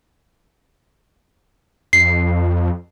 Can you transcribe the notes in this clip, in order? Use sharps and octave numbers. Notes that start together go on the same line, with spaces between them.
F2 C7